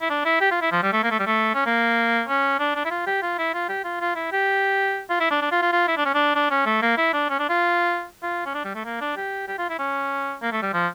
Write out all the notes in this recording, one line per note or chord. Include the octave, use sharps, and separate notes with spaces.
E4
D4
E4
G4
F4
E4
F3
G3
A3
A#3
A3
G3
A3
C#4
A#3
C#4
D4
D4
E4
F4
G4
F4
E4
F4
G4
F4
F4
E4
G4
F4
E4
D4
D4
F4
F4
F4
E4
D4
C#4
D4
D4
C#4
A3
A#3
E4
D4
C#4
D4
F4
F4
C#4
D4
G3
A3
A#3
D4
G4
G4
F4
E4
C#4
A#3
A3
G3
F3